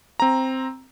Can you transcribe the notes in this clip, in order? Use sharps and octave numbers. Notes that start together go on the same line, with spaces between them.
C4 A#5